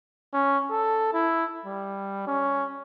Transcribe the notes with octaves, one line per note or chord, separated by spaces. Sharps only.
C#4
A4
E4
G3
C#4